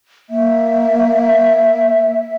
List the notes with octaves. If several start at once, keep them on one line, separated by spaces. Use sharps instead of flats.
A#3 E5